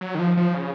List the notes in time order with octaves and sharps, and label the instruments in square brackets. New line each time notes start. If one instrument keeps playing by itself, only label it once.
[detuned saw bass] F#3
D#3
F3
F3
C#3